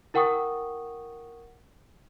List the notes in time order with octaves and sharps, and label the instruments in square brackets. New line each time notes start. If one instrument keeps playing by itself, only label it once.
[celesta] E4 A#4 F#5 G5 C#6 D#6